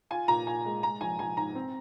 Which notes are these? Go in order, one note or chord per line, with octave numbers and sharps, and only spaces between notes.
F4 G#5
A#2 A#5
A#2 G#5
G#3
G#3 A#5
A#1 G#5
A#1 G#5
G#2 A#5
C4